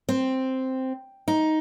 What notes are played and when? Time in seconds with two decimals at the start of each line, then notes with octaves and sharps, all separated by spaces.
0.09 C4
1.28 D#4